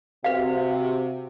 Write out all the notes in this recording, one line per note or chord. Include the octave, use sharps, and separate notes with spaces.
C3 F#4 B4 F5